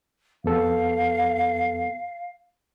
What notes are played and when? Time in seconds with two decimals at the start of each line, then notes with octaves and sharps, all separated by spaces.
0.44 F2 B3 A4 F5